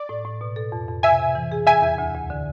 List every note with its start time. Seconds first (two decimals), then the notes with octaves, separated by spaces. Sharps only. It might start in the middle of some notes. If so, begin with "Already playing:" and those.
Already playing: D5
0.09 A2
0.25 A2
0.41 B2
0.56 A4
0.72 F2
0.88 F2
1.03 C3 E5 G#5
1.19 C3
1.35 E3
1.52 G#4
1.66 E2 E5 G#5
1.82 E2
1.98 D2
2.15 D2
2.30 D3